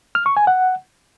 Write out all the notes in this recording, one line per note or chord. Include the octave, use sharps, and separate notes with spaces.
F6
C#6
G#5
F#5